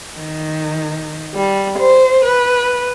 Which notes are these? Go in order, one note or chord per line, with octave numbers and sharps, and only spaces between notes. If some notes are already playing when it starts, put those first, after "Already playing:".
D#3
G3
C5
B4